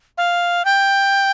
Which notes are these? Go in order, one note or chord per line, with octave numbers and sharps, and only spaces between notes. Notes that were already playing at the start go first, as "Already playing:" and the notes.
F5
G5